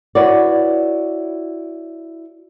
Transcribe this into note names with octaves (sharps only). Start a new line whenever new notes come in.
E4 F#4 B4 C#5 D5